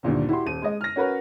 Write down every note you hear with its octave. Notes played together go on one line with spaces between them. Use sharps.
D2 G2 A#2 D#3
E4 F#4 G4 C6
D#1 D#7
G#3 D#5
F6 A#6
C#4 F#4 A#4 B4 C#5